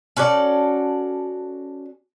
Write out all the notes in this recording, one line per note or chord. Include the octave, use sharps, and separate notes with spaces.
C#4 F#4 A4 D5